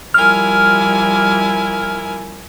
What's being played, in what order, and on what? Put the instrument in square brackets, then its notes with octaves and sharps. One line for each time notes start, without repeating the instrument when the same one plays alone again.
[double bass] F3 G3 [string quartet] E4 A#4 G#5 [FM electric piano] F6